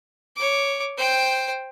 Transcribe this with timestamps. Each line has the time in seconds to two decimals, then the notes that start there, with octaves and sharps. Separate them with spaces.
0.36 C#5 D6
0.97 C5 G5